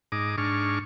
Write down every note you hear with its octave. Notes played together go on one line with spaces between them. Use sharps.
G#2 D#4 D6
G#2 D4 C#6 F6